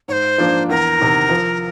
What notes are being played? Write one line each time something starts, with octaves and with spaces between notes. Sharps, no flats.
G#2 C5 C#5
F3 A#3 D4
E2 A#4
C3 D#3
F3